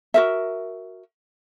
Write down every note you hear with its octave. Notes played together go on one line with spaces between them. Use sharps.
F#4 A#4 E5